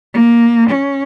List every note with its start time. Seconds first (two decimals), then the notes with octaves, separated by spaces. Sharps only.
0.13 A#3
0.69 C#4